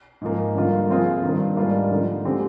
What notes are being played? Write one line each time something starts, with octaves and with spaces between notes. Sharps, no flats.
G#2 F3 A#3
G2 D3 F3 A#3 F4
F3 C4 F4 G#4
G2 D#3 A#3 D4
G#2 G3 A#3 D4 F4
D3 F3 A#3 D#4
D3 G#3 C4 G4